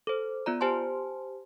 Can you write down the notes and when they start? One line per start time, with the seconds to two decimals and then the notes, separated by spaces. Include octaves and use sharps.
0.07 A4 C5
0.46 B3 F4 D5 A#5
0.61 G4 C5 G#5 A5 C6